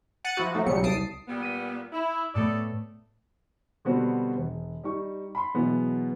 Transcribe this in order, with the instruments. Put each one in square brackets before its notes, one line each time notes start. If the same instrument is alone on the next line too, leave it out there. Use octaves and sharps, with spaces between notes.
[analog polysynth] F#5 F#6 A6 C#7 D#7
F3 E4 F#4
F3 F#3 A3 D#4 F#4
B1 C#3 F#3 G3 C#7
C2 A5 D#6 C7 D7
[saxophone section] A#2 G3 B3
[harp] B6 D#7
[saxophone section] E4
[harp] A2 A3 B3 [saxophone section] A4 D5
[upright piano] B2 D3 G3 B3 C4 F#4
E1
G3 D#4 C#6
B5 C6
B2 E3 F#3 G#3 B3